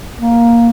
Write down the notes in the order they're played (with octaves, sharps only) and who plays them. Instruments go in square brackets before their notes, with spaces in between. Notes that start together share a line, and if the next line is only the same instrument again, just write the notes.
[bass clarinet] A#3